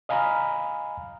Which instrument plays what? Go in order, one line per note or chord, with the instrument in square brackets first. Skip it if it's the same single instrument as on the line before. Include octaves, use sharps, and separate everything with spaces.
[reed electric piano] D#5 F5 G#5 A#5 B5 F6